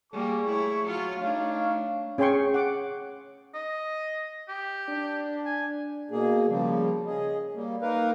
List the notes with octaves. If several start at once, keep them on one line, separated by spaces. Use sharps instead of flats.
G3 A#3 G#4 C#6
A3 E4 C#5
F#3 F4
A3 D4 D#4 C#5 F5
C#4 G#4 C#5 G5 C6 C#6
F#5 D6
D#5
G4
D4
G#5
B2 A#3 G#4
C#3 F3 G3 A#3
C#4 G#4 D#5
G3 A#3
A#3 D#4 A#4 B4 F5